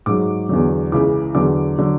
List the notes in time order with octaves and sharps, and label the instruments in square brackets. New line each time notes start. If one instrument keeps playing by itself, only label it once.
[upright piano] G#2 F#3 D6
E2 D3 F#3
C#2 C#3 E3 D6
E2 D3 F#3 D6
D3 F#3